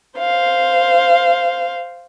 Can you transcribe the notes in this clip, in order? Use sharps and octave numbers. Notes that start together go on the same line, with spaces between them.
C5 F5